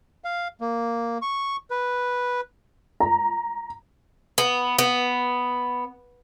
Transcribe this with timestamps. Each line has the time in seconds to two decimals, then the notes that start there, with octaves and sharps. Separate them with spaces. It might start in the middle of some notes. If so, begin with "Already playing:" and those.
0.24 F5
0.61 A#3
1.22 C#6
1.70 B4
3.00 A#5
4.38 B3
4.79 B3